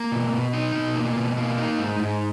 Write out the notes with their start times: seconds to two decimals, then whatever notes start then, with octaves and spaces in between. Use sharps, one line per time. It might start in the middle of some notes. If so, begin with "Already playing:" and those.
Already playing: A#3
0.12 B2
0.33 B2
0.53 D#4
0.75 B2
0.95 A#3
1.16 B2
1.37 A#3
1.58 D#4
1.79 G#2
1.99 G#2